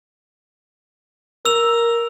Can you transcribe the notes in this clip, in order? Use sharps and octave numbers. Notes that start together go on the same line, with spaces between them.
A#4 E6 F7